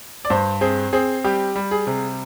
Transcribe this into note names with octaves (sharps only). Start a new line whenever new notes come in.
D5
G2 C5
C4 G#4
C4 G#4
G3 G4
G3
G#4
C3